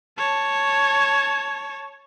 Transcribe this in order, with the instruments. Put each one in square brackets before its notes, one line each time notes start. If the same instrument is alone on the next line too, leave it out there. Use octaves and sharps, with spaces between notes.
[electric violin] C#5 A5